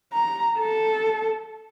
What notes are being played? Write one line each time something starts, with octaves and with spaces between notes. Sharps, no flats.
A#5
A4